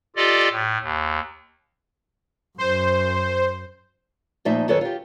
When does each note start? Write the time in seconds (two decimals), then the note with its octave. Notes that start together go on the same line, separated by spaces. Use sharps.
0.16 F4 G4 A4 D5 D#5
0.51 A2
0.81 D#2
2.58 F#2 C5
4.45 A#2 F3 A3 D#4 E5
4.68 F#2 D#3 A4 B4 C#5
4.81 F4 G4